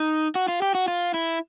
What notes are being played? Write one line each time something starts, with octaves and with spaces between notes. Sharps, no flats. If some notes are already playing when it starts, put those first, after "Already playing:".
Already playing: D#4
F#4
F4
G4
F#4
F4
E4